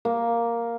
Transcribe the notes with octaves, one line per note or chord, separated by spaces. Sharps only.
A#3